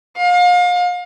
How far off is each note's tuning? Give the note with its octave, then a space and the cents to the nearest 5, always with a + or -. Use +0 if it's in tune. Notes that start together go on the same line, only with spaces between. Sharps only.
F5 +35